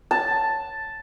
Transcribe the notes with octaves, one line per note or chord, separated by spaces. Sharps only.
A5